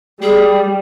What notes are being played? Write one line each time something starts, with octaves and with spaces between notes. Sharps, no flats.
G3 G#4